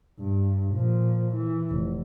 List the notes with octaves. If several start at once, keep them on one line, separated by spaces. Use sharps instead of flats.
G2
A#2 F3
E3
F1